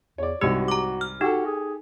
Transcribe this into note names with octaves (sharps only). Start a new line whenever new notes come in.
E2 C#5 D5
C2 G#2 F#4 G4 E6
A#5 D6
F6
D#4 F#4 G4 A4
G#4